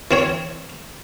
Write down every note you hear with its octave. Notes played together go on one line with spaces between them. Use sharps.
E3 C4 C#5